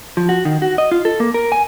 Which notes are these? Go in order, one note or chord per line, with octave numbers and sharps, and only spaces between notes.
F3
F#4
D#3
F#4
D#5
F4
A4
A#3
A#4
G#5